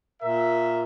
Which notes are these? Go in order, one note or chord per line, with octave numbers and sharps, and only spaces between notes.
A#2 A#4 E5